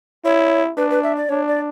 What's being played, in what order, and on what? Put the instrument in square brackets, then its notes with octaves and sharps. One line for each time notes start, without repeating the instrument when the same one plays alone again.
[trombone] E4 [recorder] C#5
[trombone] D4 [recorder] B4
[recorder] B4
E5
D5
[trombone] D4 [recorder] C#5
[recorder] D5